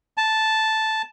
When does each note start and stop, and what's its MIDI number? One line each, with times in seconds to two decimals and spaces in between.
0.17 1.02 81